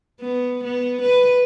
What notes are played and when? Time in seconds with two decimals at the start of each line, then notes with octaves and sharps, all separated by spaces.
0.21 B3
0.64 B3
1.02 B4